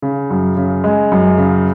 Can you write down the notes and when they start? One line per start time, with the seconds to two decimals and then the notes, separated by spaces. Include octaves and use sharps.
0.02 C#3
0.30 F#2
0.57 C#3
0.84 G#3
1.12 F#2
1.38 C#3